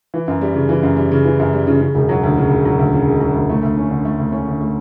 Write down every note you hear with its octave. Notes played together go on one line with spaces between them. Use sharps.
E3
F#2
G3
C#3
E3
F#2
G3
C#3
E3
F#2
G3
C#3
C#3
E1
F#3
D2
C#3
E1
F#3
D2
C#3
E1
F#3
D2
A3
D2
C#4
D3
A3
D2
C#4
D3
A3